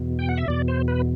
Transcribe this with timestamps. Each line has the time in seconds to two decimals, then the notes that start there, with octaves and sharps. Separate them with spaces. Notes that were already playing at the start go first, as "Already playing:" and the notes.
Already playing: E2 B2
0.19 G5
0.29 F#5
0.38 E5
0.48 E2 B2 D5
0.68 C5
0.88 B4